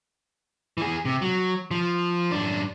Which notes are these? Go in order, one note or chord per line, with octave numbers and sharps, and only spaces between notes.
E3 G#4
C3
F#3
F3
F#2 D4